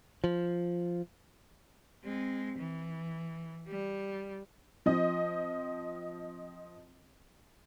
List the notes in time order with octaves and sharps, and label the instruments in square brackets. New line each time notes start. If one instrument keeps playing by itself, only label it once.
[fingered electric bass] F3
[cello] G#3 C4
E3
G3
[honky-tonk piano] F3 C4 D#5